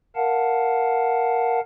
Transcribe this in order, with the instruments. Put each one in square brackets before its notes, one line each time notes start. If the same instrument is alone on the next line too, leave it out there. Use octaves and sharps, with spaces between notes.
[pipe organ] A#4 F5 F#5 A5